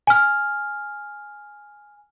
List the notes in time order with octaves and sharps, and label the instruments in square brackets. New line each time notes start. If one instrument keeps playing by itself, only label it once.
[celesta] G#5 F6